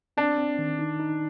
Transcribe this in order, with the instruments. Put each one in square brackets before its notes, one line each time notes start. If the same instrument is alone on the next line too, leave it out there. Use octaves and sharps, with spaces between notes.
[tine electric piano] C4 [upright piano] D4
[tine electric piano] C4
D#3
D#4
D#4